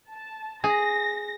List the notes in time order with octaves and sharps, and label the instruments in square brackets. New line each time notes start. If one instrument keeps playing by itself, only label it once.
[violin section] A5
[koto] G#4 [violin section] A#6